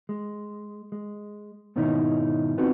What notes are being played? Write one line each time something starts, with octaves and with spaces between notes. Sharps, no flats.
G#3
G#3
G#2 B2 D#3 C#4 D#4 E4
B3 C4 D#4 F4 F#4